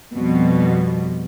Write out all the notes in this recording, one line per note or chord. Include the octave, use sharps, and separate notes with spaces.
F2 B2 G3